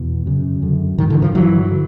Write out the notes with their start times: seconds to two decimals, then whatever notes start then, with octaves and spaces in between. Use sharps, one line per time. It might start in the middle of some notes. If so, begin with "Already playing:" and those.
Already playing: E2 B2
0.26 F#2 C#3
0.62 F#2 D3
0.98 G#2 D#3
1.10 D3 E3
1.22 D#3 F3
1.34 G2 D3 E3 F#3
1.71 D3